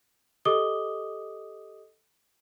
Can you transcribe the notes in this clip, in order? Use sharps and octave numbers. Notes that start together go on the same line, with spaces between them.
G4 A4 D#5 D6 D#6 G7